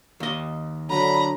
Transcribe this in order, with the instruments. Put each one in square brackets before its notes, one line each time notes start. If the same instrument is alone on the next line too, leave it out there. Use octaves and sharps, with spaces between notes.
[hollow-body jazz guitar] D#2 D#5
[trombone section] D3 F#3 [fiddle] A#5 [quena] B5